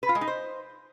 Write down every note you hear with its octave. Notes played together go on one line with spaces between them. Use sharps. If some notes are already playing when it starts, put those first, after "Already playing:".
B4
F4
G#3
D#4
C5